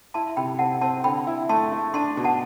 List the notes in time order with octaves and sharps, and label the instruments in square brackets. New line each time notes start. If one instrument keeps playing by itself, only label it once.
[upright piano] E4 [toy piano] A5 C6
[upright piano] C3 [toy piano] G5 B5
[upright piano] C4 [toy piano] F#5 A5
[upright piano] C4 [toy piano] A5 C6
[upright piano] D3 [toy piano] G5 B5
[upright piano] E4
[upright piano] A3 [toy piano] A5 C6
[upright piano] A3
[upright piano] D4 [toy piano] A5 C6
[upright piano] B2
[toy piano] F#5 A5